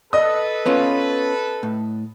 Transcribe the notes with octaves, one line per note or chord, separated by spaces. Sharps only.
A4 B4 D#5 D#6
B3 C#4 F4
A2